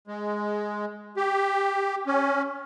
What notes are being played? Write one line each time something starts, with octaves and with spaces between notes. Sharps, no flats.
G#3
G4
C#4